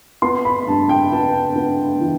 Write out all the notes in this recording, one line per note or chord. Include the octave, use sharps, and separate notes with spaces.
B3 C6
B5
G2 A5
G5
B3 A5
B3
E3